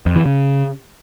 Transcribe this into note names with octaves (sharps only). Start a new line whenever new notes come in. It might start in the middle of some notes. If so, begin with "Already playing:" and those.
F2
E3
C#3